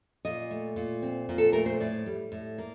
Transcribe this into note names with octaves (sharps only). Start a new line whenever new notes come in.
A#2 D#5
A3
A#2
C4
A#2
A4
A3 A#4
C5
A2 D5
G3
A2
A#3